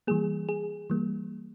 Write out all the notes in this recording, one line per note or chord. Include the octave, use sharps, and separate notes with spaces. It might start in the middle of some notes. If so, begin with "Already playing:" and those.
E3 G3 A#3 G#4
G#4
E3 G3 A#3